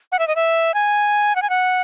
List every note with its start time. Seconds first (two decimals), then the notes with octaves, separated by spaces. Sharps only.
0.12 F#5
0.19 E5
0.28 D#5
0.36 E5
0.74 G#5
1.36 F#5
1.42 G#5
1.50 F#5